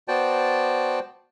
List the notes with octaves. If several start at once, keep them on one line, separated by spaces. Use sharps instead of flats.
B3 F#4 C5 D5 G5 A5